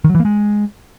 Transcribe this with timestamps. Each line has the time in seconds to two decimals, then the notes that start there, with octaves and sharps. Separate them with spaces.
0.04 D#3
0.09 F#3
0.15 E3
0.20 A#3
0.25 G#3